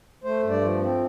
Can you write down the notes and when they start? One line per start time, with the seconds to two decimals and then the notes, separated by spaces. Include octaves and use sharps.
0.24 A3 C5
0.43 G2
0.49 D5
0.61 F3
0.80 C4